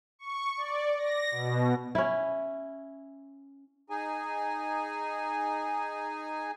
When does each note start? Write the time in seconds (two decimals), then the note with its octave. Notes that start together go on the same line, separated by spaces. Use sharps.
0.19 C#6
0.57 D5
0.97 A#6
1.31 B2
1.95 C#4 E4
3.90 D#4 G#4 G#5